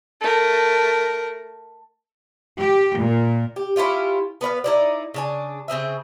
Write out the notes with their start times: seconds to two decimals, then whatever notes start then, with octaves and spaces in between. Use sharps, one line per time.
0.21 A3 A#4
2.60 G4
2.98 A#2
3.56 G4
3.76 C#4 E4 F4 G4
4.41 B3 B4 D5 F5
4.64 D#4 E4 D5
5.14 C#3 D4 G#5
5.68 C#3 C4 G#4 E5